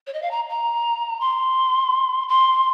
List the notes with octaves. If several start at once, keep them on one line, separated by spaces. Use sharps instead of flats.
C#5
D#5
F5
A#5
A#5
C6
C6